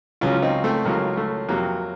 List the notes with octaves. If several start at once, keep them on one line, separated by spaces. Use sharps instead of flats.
C#2 C#3 F#3 C#4 F4
F4
C4 D#4
A3 C4
C#2 C#3 F#3 A#3
A3
F2 C3 F#3 A#3